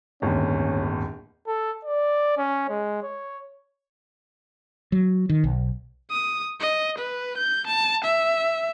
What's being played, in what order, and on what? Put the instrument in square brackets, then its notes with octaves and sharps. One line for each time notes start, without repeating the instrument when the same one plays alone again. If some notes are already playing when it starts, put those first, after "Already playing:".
[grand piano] D1 G1 D#2 [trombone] C#4
[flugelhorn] A4
D5
C#4
G#3
C#5
[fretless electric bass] F#3
D#3
B1
[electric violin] D#6
D#5
B4
G6
A5
E5